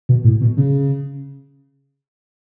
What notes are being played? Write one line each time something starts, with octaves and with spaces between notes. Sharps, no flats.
B2
A2
B2
C#3